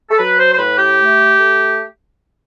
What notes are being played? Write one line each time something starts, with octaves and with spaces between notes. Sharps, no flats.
A4
F#3 B4
C5
C5
A2 B4
G4
A3
A3